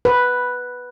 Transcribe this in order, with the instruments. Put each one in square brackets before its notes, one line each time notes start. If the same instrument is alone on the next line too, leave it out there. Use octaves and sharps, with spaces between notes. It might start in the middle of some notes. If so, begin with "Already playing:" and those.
[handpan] B4